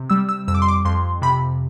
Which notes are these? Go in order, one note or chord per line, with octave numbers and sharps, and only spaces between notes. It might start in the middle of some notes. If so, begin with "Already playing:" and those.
Already playing: C3
G3 E6
E6
F2 E6
D6
C6
D6
F2 C6
C3 B5